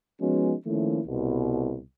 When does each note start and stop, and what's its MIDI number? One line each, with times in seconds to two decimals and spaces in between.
0.21 0.54 53
0.21 0.54 56
0.21 0.54 59
0.21 0.54 61
0.21 0.54 63
0.21 0.54 66
0.66 1.00 51
0.66 1.00 53
0.66 1.00 57
0.66 1.00 58
0.66 1.00 61
0.66 1.00 64
1.06 1.79 36
1.06 1.79 47